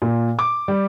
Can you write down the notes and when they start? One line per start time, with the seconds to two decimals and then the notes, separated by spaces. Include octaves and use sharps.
0.02 A#2
0.39 D6
0.68 G3